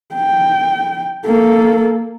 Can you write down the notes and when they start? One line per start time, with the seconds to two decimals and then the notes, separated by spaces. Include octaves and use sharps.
0.15 G5
1.25 A#3 A4